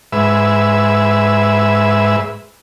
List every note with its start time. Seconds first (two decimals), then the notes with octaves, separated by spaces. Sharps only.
0.12 G#2 B4 E5